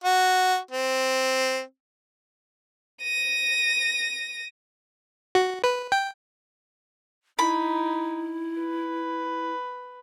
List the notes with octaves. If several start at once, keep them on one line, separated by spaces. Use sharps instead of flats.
F#4
C4
A#6 D#7
F#4
B4
G5
D#4 E4 B5
B4